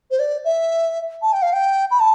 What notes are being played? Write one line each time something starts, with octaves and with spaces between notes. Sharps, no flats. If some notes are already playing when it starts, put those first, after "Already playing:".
C5
D5
E5
A5
G5
F5
G5
B5
A5